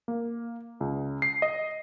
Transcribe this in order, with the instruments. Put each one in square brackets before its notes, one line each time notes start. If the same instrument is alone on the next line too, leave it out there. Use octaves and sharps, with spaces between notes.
[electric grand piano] A#3
C#2
C7
D#5